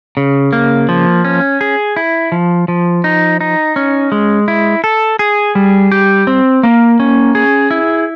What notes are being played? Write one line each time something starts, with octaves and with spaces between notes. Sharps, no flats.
C#3
A#3
F3
C#4
G#4
E4
F3
F3
D#4
D#4
C#4
G#3
E4
A4
G#4
G3
G4
C4
A#3
C#4
G#4
E4